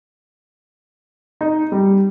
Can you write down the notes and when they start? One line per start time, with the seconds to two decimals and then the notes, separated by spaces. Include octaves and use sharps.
1.41 D#4
1.72 G3